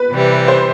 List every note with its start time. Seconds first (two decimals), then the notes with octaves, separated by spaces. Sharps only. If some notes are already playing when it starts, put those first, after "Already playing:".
Already playing: B4
0.11 C3 E3 G3
0.48 C5